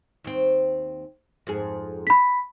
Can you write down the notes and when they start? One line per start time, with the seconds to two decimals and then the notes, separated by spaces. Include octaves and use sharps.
0.24 D#2 C4
1.47 F2 G#2 G#4
2.07 B5 B6